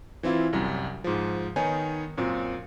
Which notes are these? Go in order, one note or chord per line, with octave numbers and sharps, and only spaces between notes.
E3 C4 E4 F4
C2 F#2 G3
G#2 F3
D#3 B3 D#4 C#5 G#5
F#2 A#2 C4